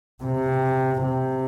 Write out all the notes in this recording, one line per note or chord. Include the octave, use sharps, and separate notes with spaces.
C3
C3